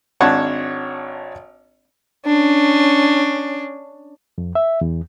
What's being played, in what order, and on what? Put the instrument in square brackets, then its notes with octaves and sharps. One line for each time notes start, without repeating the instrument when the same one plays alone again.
[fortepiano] G#1 D4 C#5 F#5 A5
[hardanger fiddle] C#4 D4
[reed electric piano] F2
E5
E2